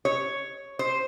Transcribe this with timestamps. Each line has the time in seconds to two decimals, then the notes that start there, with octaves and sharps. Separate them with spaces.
0.05 C#5
0.79 C5